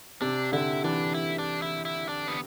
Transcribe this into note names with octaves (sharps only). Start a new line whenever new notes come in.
C3 D4
D3 E4
E3 D4
E4
D4
E4
E4
D4
B3